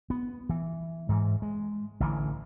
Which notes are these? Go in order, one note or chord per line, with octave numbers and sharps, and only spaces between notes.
B3
E3
G#2 E3
G#3
A1 D3 E3